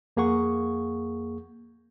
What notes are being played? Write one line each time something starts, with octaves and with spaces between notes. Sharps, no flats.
F2 A#3 G#4 F#5 C#6